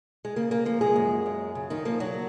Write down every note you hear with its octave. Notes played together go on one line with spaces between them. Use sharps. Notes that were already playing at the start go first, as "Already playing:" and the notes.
G#3
C#3 A#3
A#3
F3 A#3
G#3 G#4
F#2
F#2
C#3
D#3 D#4
F3 A#3
F#3 F#4